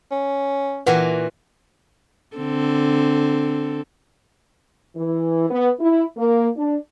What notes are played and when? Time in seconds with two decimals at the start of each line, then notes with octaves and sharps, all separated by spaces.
0.11 C#4
0.86 A#2 E3 F#4 B4 F#5 G5
2.37 D3 C4 A4
4.96 E3
5.50 B3
5.79 E4
6.17 A#3
6.57 D4